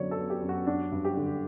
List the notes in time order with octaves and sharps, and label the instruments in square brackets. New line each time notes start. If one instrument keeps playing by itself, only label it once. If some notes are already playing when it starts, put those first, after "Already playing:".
Already playing: [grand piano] F#2 D3 F#3 B3 [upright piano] C#5 D5
[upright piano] A4
[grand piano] B3
[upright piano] G4
[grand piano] F#2
[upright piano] F#4
[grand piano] D4 [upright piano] F#4
[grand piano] G2
[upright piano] G4
[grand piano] D3